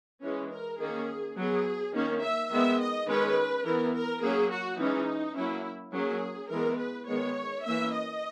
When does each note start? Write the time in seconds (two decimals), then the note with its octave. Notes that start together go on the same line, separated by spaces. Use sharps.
0.22 E3 G#3 C#4
0.51 A#4
0.79 D#3 A#3 C#4 G#4
1.36 F#3 B3 G#4
1.94 D#3 A#3 C#4
2.22 E5
2.50 D#3 G#3 B3 E5
2.79 D#5
3.08 D#3 G#3 C#4 B4
3.65 E3 B3 A#4
3.94 A#4
4.22 F#3 A#3 C#4 G#4
4.50 F#4
4.78 E3 G#3 C#4 D#4
5.35 F#3 A#3 C#4 E4
5.93 F#3 A#3 C#4 G#4
6.50 E3 G#3 B3 A#4
6.79 B4
7.07 D#3 G#3 B3 C#5
7.64 E3 A#3 C#4 E5
7.93 D#5